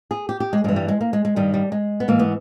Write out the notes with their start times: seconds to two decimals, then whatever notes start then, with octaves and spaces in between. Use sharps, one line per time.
0.11 G#4
0.29 G4
0.40 G4
0.53 G#3
0.64 G2 E3 G#3
0.76 G3
0.88 G#3
1.01 A#3
1.13 G#3
1.25 G#3
1.36 G2 D#3 G3
1.54 G3
1.72 G#3
2.00 B3
2.08 G#2 E3 A#3
2.19 B3